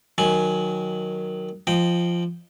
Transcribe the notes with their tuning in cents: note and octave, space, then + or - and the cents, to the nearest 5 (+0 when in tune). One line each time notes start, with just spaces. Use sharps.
D#3 -5 F#3 +0 G#5 +10
F3 -10 D#5 -20 G5 +0